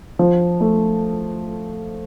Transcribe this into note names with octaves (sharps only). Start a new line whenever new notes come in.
F3
A3